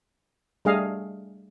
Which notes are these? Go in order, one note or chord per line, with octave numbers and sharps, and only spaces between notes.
G3 A3 D4 G#4 D#5 F5